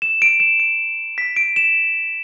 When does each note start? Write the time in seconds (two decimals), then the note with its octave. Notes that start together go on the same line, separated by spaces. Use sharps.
0.02 E7
0.22 D7
0.40 E7
0.60 D7
1.18 B6
1.36 D7
1.56 E7